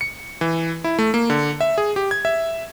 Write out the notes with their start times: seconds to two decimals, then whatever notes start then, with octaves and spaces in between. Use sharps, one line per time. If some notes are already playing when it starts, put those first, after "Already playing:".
0.01 C#7
0.41 E3
0.84 E4
0.99 A3
1.14 A#3
1.30 D3
1.61 E5
1.78 G#4
1.96 G4
2.11 G#6
2.25 E5